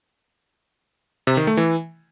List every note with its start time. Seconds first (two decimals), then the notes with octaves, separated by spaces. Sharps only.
1.27 C3
1.37 D#3
1.47 A3
1.57 E3